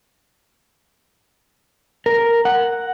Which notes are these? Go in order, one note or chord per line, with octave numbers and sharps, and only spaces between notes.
A#4
F#5